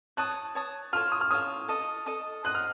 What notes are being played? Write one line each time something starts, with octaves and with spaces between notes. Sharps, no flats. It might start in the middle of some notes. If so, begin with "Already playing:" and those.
C#5 A5 D#6 F#6
C#5 A5 D#6
F4 A4 C#5 F6
D#6
F6
F4 A4 C#5 D#6
A4 D#5 A5 D#6
A4 D#5 A5 D#6
C5 D#5 F#5 F#6
F6